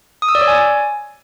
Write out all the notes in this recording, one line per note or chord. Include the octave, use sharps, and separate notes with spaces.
D#6
E6
D5
C#5
G#5